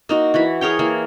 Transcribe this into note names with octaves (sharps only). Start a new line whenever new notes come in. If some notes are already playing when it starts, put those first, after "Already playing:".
A#3 D#4 F#4
E3 F#4 B5
G#4 A#4 C#5 G5
E3 A#3